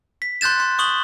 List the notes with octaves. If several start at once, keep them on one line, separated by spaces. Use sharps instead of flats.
B6
C6 F#6 G6 A6 E7
C6
C#6 D#6 F#7 G7